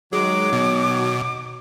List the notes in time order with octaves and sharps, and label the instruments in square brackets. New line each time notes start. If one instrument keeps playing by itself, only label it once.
[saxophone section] D#3 F#3 [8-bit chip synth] G#3 [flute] D6
[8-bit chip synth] B2